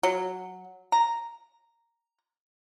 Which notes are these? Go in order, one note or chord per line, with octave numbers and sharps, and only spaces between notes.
F#3
A#5